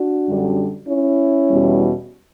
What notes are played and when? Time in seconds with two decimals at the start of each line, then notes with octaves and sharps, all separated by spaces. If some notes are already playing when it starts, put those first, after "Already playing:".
Already playing: D4 F#4
0.28 F#2 D3 G3
0.89 C#4 E4
1.50 E2 B2 G3